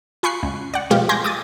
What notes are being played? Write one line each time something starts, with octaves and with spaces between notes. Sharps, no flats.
F4 G#5 B5 C#6 F#6 C7
C#2
D5 F#5
B2 F3 G#3 F4 G4
G#5 C6 D6 G6 A#6
D6 D#6 A6